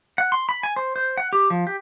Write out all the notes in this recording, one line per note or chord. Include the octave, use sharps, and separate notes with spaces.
F#5
C6
B5
G#5
C5
C5
F#5
G4
F3
G4